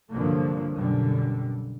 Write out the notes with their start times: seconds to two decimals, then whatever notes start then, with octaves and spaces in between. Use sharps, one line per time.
0.10 C2 G2 D3 F3 F#3 A#3
0.75 B1 F#2 D3 G3